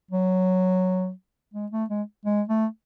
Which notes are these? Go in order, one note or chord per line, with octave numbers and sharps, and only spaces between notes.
F#3
G#3
A3
G#3
G#3
A3